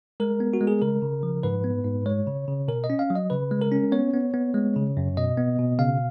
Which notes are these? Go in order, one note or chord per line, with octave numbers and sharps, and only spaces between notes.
G#3 A#4
B3
F#4
G#3
G#4
C#3 A#4
C#3
F3
G#2 B4
B3
G#2
G#3 C#5
C#3
C#3
B2 A#4
D#5
C#4
F5
F#3
D#5
C#3 B4
G#3
A#4
C#4
B3 C#5
B3
B3
G#3
C#3
F#2
B2 D#5
B3
B2
C#3 F5